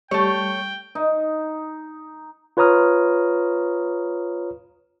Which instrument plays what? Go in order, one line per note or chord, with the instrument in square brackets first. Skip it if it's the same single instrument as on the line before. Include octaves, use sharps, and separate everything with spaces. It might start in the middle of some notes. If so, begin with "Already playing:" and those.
[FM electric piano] G3 [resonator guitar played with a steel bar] A3 C#5 [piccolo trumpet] G5
[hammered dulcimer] D#4
[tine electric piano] F4 B4 C#5 A#5 D#6 F6